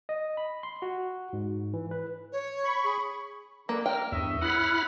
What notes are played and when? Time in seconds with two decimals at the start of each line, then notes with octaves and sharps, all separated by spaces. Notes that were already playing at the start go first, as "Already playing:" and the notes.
0.09 D#5
0.37 B5
0.63 C6
0.82 F#4
1.33 G#2
1.73 E3
1.91 B4
2.32 C#5
2.64 B5 C#6
2.84 G#4
3.69 D3 A#3
3.86 A#4 G5 F6
4.12 E2 G2 C#5 D#5 E5
4.42 C#3 E4 B4 F#5 B5 F6